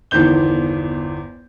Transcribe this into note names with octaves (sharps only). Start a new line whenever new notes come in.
G1 E2 D#3 C5 G6 G7